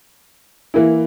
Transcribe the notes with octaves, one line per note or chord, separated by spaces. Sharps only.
E3 A#3 E4